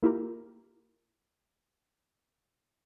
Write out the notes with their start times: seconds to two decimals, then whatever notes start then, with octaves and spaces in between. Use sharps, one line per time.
0.03 A#3 E4 F4 G4 A#4